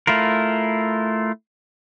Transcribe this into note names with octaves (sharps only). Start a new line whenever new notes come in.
A3 E4 F4 A#4